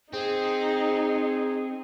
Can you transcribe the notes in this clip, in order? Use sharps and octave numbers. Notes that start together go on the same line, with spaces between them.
C4 D#4 G#4